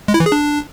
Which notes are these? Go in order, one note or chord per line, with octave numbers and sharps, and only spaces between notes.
G#3
E4
E3
G#4
D4